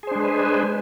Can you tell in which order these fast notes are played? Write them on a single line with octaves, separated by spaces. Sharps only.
G#4 C5 D4 G#3 B4